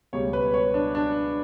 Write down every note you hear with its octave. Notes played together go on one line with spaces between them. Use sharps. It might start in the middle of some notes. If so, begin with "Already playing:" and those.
C#2 B2 G3 C#5
B4
C#5
D4
D4